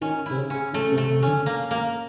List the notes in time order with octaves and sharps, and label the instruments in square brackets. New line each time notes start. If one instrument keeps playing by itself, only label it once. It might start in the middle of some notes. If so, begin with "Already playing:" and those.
[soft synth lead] D#3 [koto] C#4
[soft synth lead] C3 [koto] E4
[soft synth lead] C#3
[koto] C#4
[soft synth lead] C#3 [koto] A3
[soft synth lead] C3
[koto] A3
[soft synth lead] C3
[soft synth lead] D3 [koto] C#4
[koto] A#3
A#3